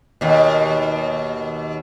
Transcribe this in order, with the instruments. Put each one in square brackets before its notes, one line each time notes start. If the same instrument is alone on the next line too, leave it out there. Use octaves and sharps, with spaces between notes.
[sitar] D#2 B2